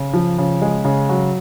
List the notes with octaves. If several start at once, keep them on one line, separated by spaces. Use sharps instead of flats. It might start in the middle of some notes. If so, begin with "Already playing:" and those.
Already playing: C#3
F3
C#3
G#3
C#3
F#3